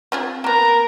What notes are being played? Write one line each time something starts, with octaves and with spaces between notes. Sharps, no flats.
C4 F4 G#4
A#3 B3 A#4 A#5